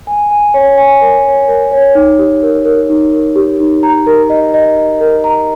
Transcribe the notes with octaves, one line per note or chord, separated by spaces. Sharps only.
G#5
G#5
C#5
G#5
A#4
C#5
A#4
C#5
D#4
G4
A#4
A#4
D#4
A#4
G4
D#4
A#5
A#4
D#5
D#5
D#5
A#4
A#5